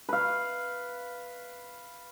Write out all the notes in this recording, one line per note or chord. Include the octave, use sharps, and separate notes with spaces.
B4 F5